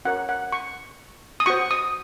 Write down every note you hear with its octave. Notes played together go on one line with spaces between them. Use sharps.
C#4 F#4 A#4 C#5 F#5
F#5
C#6
D#6
F#4 C5 C#6
D#6